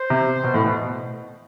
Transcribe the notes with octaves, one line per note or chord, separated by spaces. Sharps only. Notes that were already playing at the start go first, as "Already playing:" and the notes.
Already playing: C5
C3
B2
A2
B2